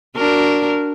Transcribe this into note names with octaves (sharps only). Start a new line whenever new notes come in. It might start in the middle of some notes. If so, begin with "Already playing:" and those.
D4 F#4 A#4